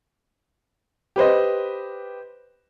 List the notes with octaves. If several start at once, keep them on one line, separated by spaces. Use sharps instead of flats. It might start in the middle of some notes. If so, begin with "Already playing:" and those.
G4 B4 C5 D#5